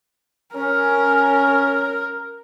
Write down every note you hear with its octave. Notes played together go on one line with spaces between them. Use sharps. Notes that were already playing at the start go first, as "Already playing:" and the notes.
C#4 A#4